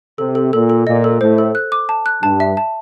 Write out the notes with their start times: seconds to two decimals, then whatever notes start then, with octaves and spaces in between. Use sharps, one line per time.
0.18 C3 A4
0.35 A4
0.53 A#2 A4
0.70 A4
0.87 A#2 D#5
1.04 A4
1.21 A2 C5
1.38 A4
1.55 F#6
1.72 D6
1.89 A5
2.06 F#6
2.23 G2 A5
2.40 E5
2.57 A5